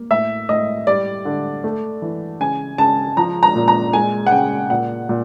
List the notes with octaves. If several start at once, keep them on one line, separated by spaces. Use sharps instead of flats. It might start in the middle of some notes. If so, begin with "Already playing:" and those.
Already playing: A#3
A2 E5
A2 D#5
G3 D5
D3
A3
E3
C#3 G#5
C#3 A5
F3 A#5
A#5
A#2
A#5
G#3 G#5
F#5
C#3 G5
A#2 F#5
A#2